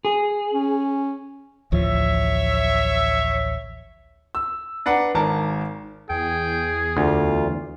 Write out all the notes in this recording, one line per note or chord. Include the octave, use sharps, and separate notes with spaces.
G#4
C#4
A1 D2 F3 C#5 E5
E6
D4 B4 F#5 A#5
G#1 A#4 A5
E2 G#4 G5
D2 F4